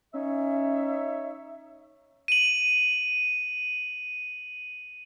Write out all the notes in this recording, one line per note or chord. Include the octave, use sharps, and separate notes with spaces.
C#4 D#4 C#5 E5
D#7 F#7